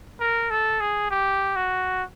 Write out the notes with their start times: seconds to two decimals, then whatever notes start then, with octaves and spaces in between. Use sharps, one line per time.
0.20 A#4
0.51 A4
0.80 G#4
1.11 G4
1.56 F#4